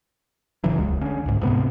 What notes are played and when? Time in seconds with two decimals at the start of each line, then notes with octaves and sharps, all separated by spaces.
0.64 G1 C#3 E3 F#3
0.78 D#1 C#2 G#3
1.01 D3 C#4
1.26 C2 G#2
1.41 D2 G#2 C3 B3